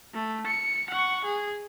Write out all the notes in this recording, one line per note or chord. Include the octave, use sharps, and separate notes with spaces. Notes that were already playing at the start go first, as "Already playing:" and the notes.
A3
C#7
F#5 C#6
G#4